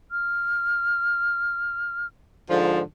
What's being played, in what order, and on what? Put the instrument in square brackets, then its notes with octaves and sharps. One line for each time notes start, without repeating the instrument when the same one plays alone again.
[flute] F6
[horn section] G#2 D3 F3